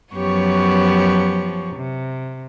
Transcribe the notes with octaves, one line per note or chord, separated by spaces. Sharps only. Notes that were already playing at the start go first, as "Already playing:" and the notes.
F#2 F3 B3 G4 C#5 C#6
C3